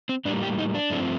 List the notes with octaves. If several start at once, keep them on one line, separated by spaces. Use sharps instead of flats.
C4
A2 G3 A#3 D4
G4
D#4
D4
G2 F3 A3 C4